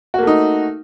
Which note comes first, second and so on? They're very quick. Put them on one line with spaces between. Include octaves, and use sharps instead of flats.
F#4 A#3 A3 D#4